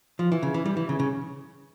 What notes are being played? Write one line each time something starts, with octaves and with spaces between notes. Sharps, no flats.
F3
E3
C#3
E3
G3
E3
C#3
C#3